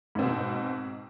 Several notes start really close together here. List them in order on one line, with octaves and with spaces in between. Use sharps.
G#2 C4 B2